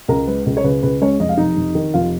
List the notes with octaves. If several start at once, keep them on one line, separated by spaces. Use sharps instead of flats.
C#2 A#4 A#5
G#3 B4
C#2
C#5
C#3 B4
C#2 B4
G#3 C#4 C#5
F1 D#5
F5
F1 D#4 D#5
F1
D#3
F1 F4 F5